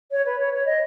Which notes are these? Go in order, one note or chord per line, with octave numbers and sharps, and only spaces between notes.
C#5
B4
C#5
C#5
D#5